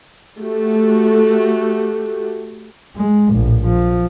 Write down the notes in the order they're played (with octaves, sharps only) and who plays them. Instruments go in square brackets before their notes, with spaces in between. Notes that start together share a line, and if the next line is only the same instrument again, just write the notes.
[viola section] A3 F#4 G4
[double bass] G#3
A#1 A2
F3